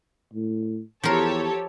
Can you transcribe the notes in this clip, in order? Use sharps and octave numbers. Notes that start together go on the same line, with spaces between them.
A2
E2 F3 G4 A4 A#4 C#5